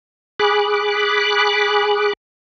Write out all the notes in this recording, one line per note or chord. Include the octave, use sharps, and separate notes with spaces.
G#4 B5 D6 F#6